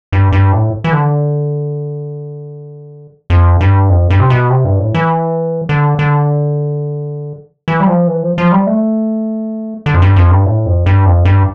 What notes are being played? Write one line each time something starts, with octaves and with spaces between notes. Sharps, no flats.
G2
G2
A2
E3
D3
F2
G2
F2
G2
C3
B2
C3
G2
A2
E3
D3
D3
E3
G3
F3
E3
F3
F3
G3
A3
D3
F2
G2
F2
G2
A2
F2
G2
F2
G2